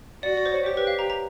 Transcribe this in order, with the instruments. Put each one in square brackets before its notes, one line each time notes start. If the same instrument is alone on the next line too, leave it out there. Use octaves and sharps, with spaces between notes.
[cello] F#4 [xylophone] D5
[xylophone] D5
C5
C#5
[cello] G4 [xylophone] C5
[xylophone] B4
F5
A#5
A#5